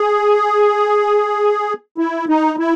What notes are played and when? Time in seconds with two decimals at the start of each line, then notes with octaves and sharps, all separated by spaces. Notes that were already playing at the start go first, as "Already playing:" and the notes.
Already playing: G#4
1.98 E4
2.29 D#4
2.59 E4